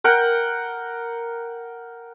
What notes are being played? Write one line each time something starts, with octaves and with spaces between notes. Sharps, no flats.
A#4 F#5 G5